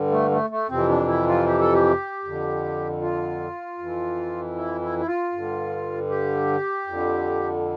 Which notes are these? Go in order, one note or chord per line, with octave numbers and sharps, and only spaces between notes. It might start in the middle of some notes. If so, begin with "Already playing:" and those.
Already playing: G2 D3
A3
A3
A3
F2 C3 E3 C4
D4
E4
F4
G4
A4
G4
F2 D3
F4
F2 E3
E4
E4
E4
F4
G2 D3
G4
F2 D3